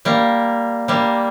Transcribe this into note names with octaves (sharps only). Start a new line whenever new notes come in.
G3 A#3
G3 A#3